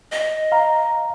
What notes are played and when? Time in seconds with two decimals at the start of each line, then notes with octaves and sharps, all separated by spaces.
0.12 D#5
0.52 F5 A#5